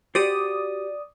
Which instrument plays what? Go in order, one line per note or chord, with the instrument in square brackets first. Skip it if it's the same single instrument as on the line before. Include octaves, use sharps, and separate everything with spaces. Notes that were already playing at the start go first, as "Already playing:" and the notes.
[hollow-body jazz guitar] F#4 G4 C5 [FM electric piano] D5 D#6